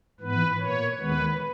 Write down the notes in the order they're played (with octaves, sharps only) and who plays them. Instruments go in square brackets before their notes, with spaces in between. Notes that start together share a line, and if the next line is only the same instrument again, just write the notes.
[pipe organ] G#2 E3 B3 B4
A#2 A#3 C#5
D#2 D#3 G#3 B3 B4